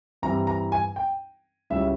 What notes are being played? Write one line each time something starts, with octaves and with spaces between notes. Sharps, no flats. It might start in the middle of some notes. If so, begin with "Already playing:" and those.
G2 E3 G3 C4 E4 A#5
A#5
G#5
G5
C#2 C#3 G3 C#4 E4 E5